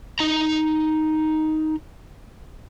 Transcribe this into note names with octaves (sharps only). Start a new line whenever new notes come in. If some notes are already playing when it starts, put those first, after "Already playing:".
D#4 A#5